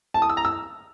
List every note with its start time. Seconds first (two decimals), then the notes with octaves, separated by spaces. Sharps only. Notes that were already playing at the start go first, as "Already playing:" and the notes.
0.14 A5
0.22 D#6
0.30 E6
0.37 A#5
0.45 E6